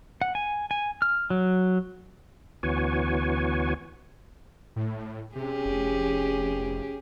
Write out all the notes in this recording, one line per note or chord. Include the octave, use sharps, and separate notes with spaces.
F#5
G#5
G#5
F6
F#3
D2 E3 B3 F#4 C#5 G#5
A2
C3 C#4 G4 G#4
F1